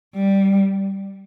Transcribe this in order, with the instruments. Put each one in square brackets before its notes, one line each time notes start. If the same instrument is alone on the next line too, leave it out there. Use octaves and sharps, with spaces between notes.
[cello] G3